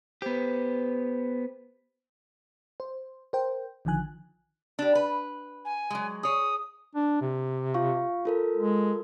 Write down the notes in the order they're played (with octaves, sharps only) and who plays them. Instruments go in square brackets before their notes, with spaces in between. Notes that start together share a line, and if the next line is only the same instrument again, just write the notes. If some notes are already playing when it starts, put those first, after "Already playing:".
[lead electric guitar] B3 G4 [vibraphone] B4 C5
[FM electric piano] C5
A#4 C5 G5
A#1 D3 D#3 F3 G#5 F#6
[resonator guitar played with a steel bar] D4 G4
B4
[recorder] G#5
[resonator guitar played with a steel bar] F#3 G#3
[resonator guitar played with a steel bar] G#4 C#5 [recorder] D#6
[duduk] D4
C3
[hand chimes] F4 F5 C#6
F4 A4 A#4
[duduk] G#3